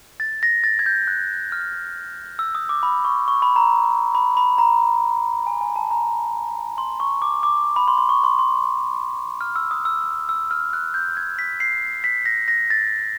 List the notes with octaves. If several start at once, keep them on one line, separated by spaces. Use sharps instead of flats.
A6
A#6
A6
G#6
G6
F#6
F6
E6
D#6
D6
B5
C#6
C#6
B5
A#5
B5
B5
A#5
G#5
G#5
A5
A#5
C6
C#6
D6
D6
B5
C6
C6
C#6
C6
C6
F6
E6
D#6
E6
E6
F6
F#6
G6
G#6
B6
C7
B6
A#6
A#6
A6